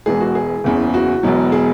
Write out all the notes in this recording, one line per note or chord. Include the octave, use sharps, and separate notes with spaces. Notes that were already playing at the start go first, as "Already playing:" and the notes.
E1 E2 E3 G#3 G#4
F#4
G#4
F#1 E2 C#3
F#4
E1 E2 B2 F#3
G#4